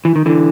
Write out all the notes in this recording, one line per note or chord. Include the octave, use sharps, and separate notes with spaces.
E3
D#3
D3 E3